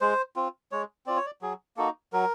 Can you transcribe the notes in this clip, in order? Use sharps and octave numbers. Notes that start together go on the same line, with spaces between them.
G#3 C5
C4 F4
G#3 C#5
C4 F4 D5
C#5
D5
F#3 G#4
A#3 D#4 F#4 A4
F#3 A#4